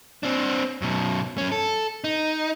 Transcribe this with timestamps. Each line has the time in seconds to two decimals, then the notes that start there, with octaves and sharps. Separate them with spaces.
0.23 C4 D4
0.82 F#2 B2
1.38 F#2 C#4
1.52 A4
2.04 D#4